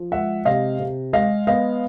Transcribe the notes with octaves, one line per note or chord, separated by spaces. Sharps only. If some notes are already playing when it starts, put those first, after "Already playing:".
Already playing: F3
G#3 E5 F#5
C3 D#5 F5
C3
G#3 D#5 F5
B3 D#5 F5